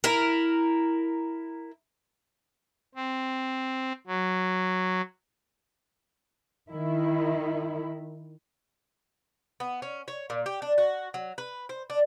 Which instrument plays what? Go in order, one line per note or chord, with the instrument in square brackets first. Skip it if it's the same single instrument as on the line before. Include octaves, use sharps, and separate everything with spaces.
[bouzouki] E4 A#4
[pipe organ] C4
F#3
[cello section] D#3 E4
[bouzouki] B3
C#4
C#5
A#2
G4
D4
F#4
F#3
B4
C5
D4